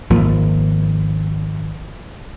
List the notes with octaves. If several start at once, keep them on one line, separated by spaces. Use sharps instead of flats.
G#1 F3 A#3